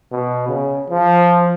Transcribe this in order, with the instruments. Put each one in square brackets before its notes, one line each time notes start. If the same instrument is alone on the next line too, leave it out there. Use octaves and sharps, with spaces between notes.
[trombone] B2
C#3
F3